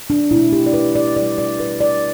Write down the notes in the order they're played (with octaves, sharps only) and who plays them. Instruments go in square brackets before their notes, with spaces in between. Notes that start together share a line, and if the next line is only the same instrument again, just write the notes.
[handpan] D4
B2 A3 E4
G4
D5
B4
D5
B2 D5
G3
D5
B4
D5